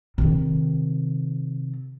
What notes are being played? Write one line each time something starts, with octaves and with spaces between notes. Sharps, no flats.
C3 D#3